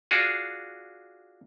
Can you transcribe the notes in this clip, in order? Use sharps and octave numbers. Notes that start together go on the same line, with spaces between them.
D4 F4 F#4 G#4